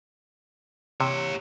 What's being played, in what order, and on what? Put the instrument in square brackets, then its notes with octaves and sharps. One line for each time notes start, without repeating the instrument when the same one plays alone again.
[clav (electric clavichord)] C3 [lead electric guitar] G4 C#5